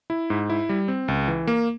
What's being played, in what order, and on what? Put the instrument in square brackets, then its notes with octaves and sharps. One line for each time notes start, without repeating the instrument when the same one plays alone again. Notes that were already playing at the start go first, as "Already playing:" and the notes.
[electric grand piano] E4
G#2
E4
G3
C4
C#2
E3
A#3